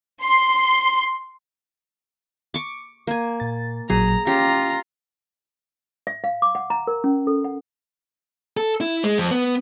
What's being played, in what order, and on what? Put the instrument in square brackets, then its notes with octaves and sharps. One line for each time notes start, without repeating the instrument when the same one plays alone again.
[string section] C6
[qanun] C#6 D6
A#3 G#5
[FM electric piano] A#2 A6
[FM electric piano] A1 A#2 F#3 [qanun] G#4 [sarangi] A#5
[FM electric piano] C#4 [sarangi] F4 [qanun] G4 [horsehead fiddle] A#5
[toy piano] E5
F5
D6
F#5
A#5
A#4
C#4
A4
F#5
[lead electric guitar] A4
E4
G#3
F2
B3